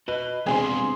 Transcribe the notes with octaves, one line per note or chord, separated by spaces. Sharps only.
F#4 B4 D#5
E2 C3 G#3 D4 G#4 G#5 C6